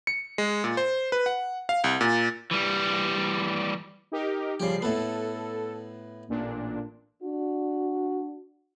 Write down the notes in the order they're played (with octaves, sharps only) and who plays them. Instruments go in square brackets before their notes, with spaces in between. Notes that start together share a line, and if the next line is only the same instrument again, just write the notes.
[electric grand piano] C#7
G#3
A#2
C5
B4
F#5
F5
C2
A#2
[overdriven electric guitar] E3 G3
[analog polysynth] D#4 G4 A#4
[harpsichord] C#3 G4 [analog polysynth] F3 G3 C7
[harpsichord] A2 B3 [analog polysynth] A4
[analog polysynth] A1 A#2 D4
[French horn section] D4 F#4